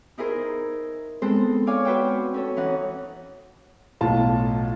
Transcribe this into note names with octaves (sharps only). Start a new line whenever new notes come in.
D#4 E4 G#4 A#4 C5
G#3 B3 C4 A4 C5
C#5 D5 F5 G#5 D6
F#4 B4 C5 G5 E6
C#4 A4 C#5
E3 C#4 D#4 F#5
B1 A2 F4 A5